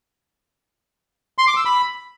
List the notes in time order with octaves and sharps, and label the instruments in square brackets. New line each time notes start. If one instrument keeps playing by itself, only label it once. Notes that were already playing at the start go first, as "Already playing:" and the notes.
[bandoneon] C6
D6
E6
B5